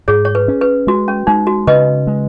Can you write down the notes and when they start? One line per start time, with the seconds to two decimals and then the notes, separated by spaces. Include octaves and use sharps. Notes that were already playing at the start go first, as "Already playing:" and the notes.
0.08 G#2 G#4 C#5
0.25 C#5
0.35 B4
0.48 C#4
0.61 B4
0.87 G#3 F#4
1.08 C#4
1.27 G#3 D#4
1.47 F#4
1.67 C#3 B4 D#5
2.07 G#3